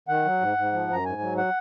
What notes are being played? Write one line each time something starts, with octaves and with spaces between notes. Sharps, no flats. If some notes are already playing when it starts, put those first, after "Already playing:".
D#3 F#5
F#3
G#2
G#2
F3
F#2 A#5
G#2 G#5
F#3
F#5